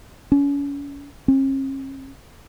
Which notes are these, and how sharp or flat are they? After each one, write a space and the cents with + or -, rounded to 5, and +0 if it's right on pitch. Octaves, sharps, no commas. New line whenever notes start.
C#4 +35
C#4 -45